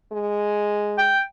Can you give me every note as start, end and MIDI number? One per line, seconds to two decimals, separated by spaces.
0.12 1.16 56
0.98 1.21 79